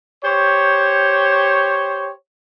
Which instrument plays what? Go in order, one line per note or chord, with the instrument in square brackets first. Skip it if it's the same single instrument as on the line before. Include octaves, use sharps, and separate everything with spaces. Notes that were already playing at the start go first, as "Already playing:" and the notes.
[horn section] G4 C5 C#5